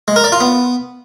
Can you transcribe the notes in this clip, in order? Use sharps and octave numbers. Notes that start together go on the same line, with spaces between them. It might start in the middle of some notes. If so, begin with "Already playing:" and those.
G#3
A#4
D5
F4
B3